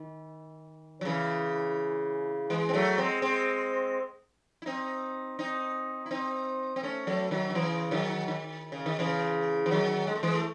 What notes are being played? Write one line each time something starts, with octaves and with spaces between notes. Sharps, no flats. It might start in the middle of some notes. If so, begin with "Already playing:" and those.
Already playing: D#3
F#3
C#3 E3
E3 G#3
C4
F#3 A3
G#3 C4
G#3 C4
E4
C4 D#4
C4 D#4
E4
C4 D#4
C4
A3 C#4
F#3 A3
D#3 F#3
D#3
C#3 E3
D#3 F#3
D#3
C#3
D#3
C#3 E3
E3
D#3 F#3
G#3
A3
E3 G#3
A3